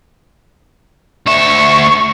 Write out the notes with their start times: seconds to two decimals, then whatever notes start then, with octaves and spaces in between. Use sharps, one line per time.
1.26 D2 E5 C#6